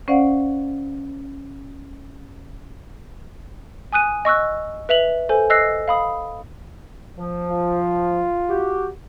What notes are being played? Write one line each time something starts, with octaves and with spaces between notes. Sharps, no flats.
C#4 C5 D5 F5 F#5
G#5 D#6 F#6 D#7
D#5 C#6 E6 F#6
B4 E5 F7 F#7
A4 C5 G#5
D#5 E6 F#6 A#6 C7
F5 B5 D#6
F3
F4
F#4 G4